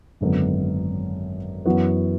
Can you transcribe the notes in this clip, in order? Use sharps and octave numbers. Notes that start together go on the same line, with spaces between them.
G#1 F#2 D3 F#3 B3
F#2 E3 B3 F#4